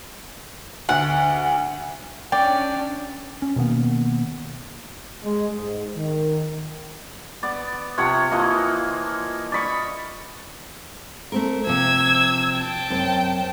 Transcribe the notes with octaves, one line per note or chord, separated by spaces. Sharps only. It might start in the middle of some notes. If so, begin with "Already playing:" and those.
D2 F#5
C#4 D4 D5 G5
C#4
B2 D#3 A#3 B3
G#3
G#2
D#3
B3 D5
C3 F3 C#5 F#5
E3 F3 A#3 D#5
D5 D#5 B5 C#6
A3 C4 A#4
C3 F3 E6 G#6
G5 A5
F#2 C4